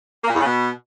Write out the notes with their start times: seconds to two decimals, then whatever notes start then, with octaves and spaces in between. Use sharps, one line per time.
0.24 A#3
0.30 A#2
0.35 E2
0.40 C#3
0.46 B2